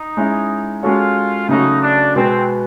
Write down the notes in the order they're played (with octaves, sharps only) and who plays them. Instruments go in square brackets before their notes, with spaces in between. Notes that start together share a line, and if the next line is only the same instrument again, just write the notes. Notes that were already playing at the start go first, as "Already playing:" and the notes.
Already playing: [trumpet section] D#4
[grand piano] G#3 C#4 E4
[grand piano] G#3 C#4 F#4 A4 C#5 [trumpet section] F4
[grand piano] C#3 F#3 A3 C#4 F#4 [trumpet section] D#4
[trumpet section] D4
[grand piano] B2 G#3 B3 [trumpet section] C4